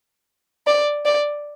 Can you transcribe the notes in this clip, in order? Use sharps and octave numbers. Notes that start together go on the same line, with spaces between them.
D5
D5